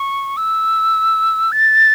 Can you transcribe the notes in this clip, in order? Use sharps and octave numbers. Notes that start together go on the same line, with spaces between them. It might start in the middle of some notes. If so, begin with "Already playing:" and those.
Already playing: C#6
E6
A6